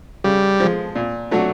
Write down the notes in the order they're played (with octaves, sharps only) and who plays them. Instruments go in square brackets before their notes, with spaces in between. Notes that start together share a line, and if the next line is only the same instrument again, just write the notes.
[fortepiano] C#3 [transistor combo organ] G3
[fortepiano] F3 G#3
A#2
F#3 A3 D4 F#4